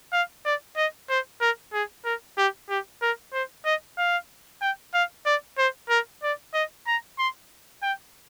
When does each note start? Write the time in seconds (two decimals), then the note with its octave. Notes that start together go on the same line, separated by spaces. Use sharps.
0.13 F5
0.45 D5
0.77 D#5
1.09 C5
1.41 A#4
1.73 G#4
2.05 A#4
2.38 G4
2.69 G4
3.02 A#4
3.33 C5
3.65 D#5
3.98 F5
4.61 G5
4.94 F5
5.26 D5
5.58 C5
5.89 A#4
6.23 D5
6.54 D#5
6.87 A#5
7.18 C6
7.83 G5